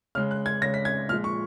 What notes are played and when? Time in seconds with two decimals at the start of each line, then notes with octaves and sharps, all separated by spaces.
0.15 C#3 G#3 F6
0.31 F#6
0.46 G#6
0.61 C#3 A#6
0.66 G#3
0.74 B6
0.85 G#6
1.09 A#2 F3 G#3 F6
1.24 C#6